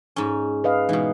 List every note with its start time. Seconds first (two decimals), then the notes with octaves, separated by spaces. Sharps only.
0.16 G#2 C#4
0.64 B4 D#5 F5
0.89 B2 E3 G#3 D#4